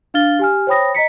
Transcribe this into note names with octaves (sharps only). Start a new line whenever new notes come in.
D4 F5 F6 A6 G7
G4 G#5 F6
C5 C#5 G5 B5 D#6 A#6
D#5 A#5 B6 C#7